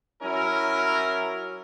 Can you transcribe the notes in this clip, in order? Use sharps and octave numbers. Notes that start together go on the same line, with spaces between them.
F#3 C#4 E4 A#4